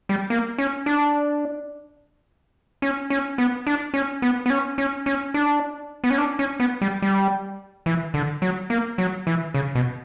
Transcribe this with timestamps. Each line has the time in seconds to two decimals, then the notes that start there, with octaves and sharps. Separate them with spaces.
0.09 G3
0.30 A#3
0.58 C#4
0.86 D4
2.82 C#4
3.10 C#4
3.38 B3
3.67 D4
3.94 C#4
4.22 B3
4.46 B3
4.50 C#4
4.78 C#4
5.06 C#4
5.34 D4
6.04 B3
6.11 C#4
6.18 D4
6.39 C#4
6.60 B3
6.82 G3
7.02 G3
7.86 E3
8.14 D3
8.42 F#3
8.70 A#3
8.98 F#3
9.27 E3
9.54 C#3
9.75 B2